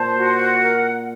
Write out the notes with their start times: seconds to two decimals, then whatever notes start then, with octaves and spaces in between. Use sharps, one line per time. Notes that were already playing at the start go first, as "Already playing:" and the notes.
Already playing: A#2 C5 A5
0.16 F#4
0.39 F#5
0.61 A#4